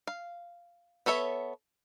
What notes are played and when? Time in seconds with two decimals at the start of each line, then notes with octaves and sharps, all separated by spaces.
0.07 F5
1.06 B3 A4 C#5 E5